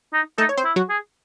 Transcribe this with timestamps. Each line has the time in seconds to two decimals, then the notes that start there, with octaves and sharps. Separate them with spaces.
0.13 D#4
0.38 A3 D#4 A4
0.49 C#5
0.57 C4 C5
0.64 E4
0.76 F#3 F#4
0.89 G#4